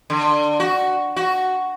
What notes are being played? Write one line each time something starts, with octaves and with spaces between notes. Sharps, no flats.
D3
F#4
F#4